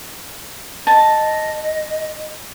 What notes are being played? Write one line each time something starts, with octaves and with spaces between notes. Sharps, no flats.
D#5 A5